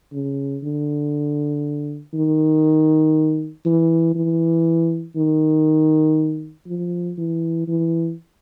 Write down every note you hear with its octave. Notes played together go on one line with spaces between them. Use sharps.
C#3
D3
D#3
E3
E3
D#3
F3
E3
E3